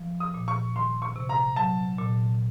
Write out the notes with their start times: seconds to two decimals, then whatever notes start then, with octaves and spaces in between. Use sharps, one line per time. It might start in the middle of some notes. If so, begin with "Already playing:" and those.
Already playing: F3
0.20 D#6
0.34 A#2
0.48 C#6
0.76 D#3 C6
1.02 C#6
1.16 C3
1.29 A#5
1.56 F#3 A5
1.98 A#2